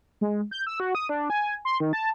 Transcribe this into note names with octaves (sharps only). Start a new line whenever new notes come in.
G#3
G6
E6
F#4
D#6
D4
G#5
C6
D#3
A5